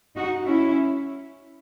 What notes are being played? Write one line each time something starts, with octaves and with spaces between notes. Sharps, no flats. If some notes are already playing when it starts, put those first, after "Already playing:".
D#4 F#4
C#4 E4